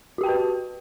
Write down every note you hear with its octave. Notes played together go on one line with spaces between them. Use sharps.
F#4 G4 B4 G5 A5